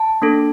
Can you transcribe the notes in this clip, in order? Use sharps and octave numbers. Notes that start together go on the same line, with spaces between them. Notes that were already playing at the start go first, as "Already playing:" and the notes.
Already playing: A5
A#3 D4 A4